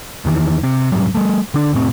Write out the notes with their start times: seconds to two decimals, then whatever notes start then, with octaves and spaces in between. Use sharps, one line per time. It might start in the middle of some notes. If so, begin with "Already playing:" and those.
0.25 E2 D#3 E3
0.63 C3
0.92 F1 G#2 F#3 G3
1.15 G3 A3
1.54 D3 D4
1.73 F1 A2 C4